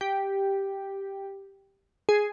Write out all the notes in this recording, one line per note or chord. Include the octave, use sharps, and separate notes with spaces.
G4
G#4